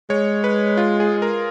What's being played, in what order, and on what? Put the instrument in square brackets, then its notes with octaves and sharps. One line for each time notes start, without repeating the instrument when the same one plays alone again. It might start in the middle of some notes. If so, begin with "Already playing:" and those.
[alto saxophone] G#3 [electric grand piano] C#5
[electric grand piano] B4
F4
G#4
A#4